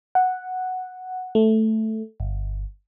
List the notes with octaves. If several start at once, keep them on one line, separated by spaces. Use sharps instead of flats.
F#5
A3
G1